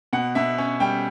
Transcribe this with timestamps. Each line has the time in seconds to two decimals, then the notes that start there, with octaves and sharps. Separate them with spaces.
0.13 B2 F#5
0.35 B2 E5
0.58 C#4
0.80 G3 G5